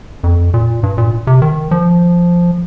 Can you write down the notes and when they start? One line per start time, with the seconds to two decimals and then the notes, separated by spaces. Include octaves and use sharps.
0.24 F2
0.54 A#2
0.83 G2
0.98 A#2
1.27 C3
1.42 D#3
1.71 F3